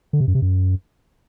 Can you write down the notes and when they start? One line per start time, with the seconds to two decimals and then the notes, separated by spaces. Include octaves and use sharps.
0.13 D3
0.20 C3
0.28 F#2
0.35 C3
0.42 F#2